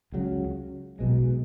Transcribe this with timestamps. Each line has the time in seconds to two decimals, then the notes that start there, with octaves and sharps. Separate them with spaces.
0.12 C#2 C#3 F#3
0.99 B1 B2 G#3